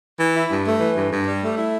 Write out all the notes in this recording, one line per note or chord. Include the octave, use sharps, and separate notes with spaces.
E3
E4
G2
A3
E3
G2
G2
G3
A3
E4